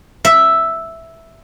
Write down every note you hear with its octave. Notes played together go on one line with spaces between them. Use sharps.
E5